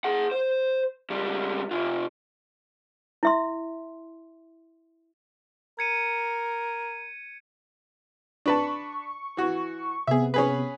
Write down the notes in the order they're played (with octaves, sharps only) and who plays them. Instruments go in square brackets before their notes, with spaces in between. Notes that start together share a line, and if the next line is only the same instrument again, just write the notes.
[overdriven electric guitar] G#4 F#5
C5
C#2 G3
C3 F4
[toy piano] E4 E5 C6
[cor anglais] A#4 [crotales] G#6 C#7 D#7
[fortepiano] D4 B4 A5 [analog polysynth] C#6
[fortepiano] E3 F#4
[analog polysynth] C3 B3 [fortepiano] G#4 E5
[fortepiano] C#4 G#4 B4